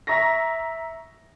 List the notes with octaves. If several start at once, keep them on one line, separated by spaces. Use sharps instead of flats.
E5 A#5 C#6 A#6